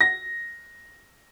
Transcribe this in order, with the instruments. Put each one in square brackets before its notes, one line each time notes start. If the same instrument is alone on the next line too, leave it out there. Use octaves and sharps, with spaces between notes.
[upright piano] A#6